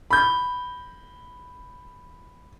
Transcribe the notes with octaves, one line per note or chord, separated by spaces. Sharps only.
B5 G6